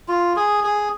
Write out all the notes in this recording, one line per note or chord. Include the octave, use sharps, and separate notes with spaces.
F4
G#4
G#4